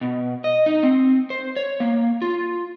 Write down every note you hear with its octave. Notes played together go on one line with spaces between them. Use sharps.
B2
D#5
D#4
C4
C5
C#5
A#3
F4